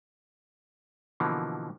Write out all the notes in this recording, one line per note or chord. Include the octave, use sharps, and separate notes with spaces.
B2 D3 E3 F3 A#3